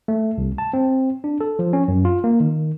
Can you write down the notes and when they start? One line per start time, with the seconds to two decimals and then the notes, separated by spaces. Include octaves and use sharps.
0.08 A3
0.38 C2
0.58 A5
0.73 C4
1.24 D4
1.41 A4
1.59 F3
1.73 C#4
1.88 F#2
2.05 F4
2.24 A#3
2.40 D#3